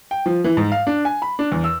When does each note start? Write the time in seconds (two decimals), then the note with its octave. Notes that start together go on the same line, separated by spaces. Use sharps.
0.11 G5
0.26 F3
0.44 E3
0.57 G#2
0.72 F5
0.87 D4
1.05 G#5
1.22 B5
1.39 D4
1.52 E2
1.64 E6